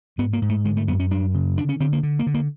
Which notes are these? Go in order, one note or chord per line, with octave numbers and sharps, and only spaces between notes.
G#2 B3
A#3
G#2
A3
D3 G#3
A3
F#2 B3
C#4
F#2 D4
C#3
D3 D4
C#4
D3 C4
A#3
D3
A#3
D3
A#3